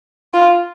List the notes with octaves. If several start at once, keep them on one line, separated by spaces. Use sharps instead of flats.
F4